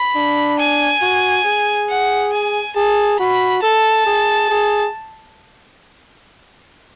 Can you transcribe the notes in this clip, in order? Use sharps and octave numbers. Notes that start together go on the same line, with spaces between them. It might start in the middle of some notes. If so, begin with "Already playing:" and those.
Already playing: B5
D4
G#5
F#4
G#4
F#5
G#5
G#4 A5
F#4 B5
A4 A5
G#4
G#4